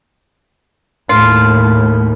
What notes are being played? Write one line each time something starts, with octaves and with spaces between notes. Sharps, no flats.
D#2 A2 F4